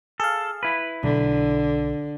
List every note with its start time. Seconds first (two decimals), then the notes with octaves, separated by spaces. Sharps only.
0.20 G#4 A4 F5
0.63 E4 B4
1.04 B1 D3